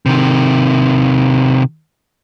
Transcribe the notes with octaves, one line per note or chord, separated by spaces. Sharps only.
C3 D#3